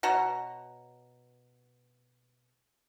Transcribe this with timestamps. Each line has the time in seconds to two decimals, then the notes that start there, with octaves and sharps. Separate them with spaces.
0.03 B2 F#4 C#5 A#5